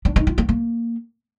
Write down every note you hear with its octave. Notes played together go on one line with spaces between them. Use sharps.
D4
D#4
F4
A#3
A#3